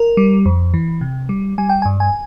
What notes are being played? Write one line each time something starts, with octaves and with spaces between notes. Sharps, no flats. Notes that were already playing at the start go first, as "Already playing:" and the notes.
Already playing: A#4
G3
F2
E3
C3
G3
G3 G#5
G5
G#5
G2
G#5